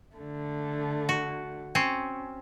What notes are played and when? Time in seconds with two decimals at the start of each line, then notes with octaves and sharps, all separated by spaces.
0.17 D3 A3
1.09 F#4
1.75 C4 C#4